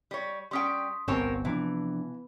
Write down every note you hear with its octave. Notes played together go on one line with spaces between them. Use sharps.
G3 C#5
G3 C#4 G5 C6 D#6 B6
G1 C2 C3 B3 C4 A#4 C#5
C3 E3 F3 D4